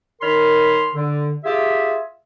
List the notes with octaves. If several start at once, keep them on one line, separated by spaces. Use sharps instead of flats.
D#3 A#4 C#5 B5 C6 F6
D3
F4 G4 G#4 E5